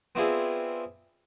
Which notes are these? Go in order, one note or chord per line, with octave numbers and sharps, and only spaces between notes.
B3 C4 D4 E4 F4 G#4